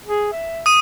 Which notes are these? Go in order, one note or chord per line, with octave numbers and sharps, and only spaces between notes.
G#4
E5
D#6 D#7